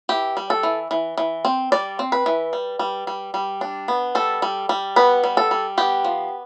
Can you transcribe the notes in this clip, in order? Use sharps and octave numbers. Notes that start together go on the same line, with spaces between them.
E3 G4
G3
A4
E3
E3
E3
C4
G3 D5
C4
B4
E3
G3
G3
G3
G3
D4
B3
G3 A4
G3
G3
B3 B4
G3
A4
G3
B3 G4
F3